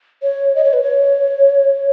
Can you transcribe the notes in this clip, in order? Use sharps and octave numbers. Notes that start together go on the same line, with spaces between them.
C#5
D#5
C#5
B4
C#5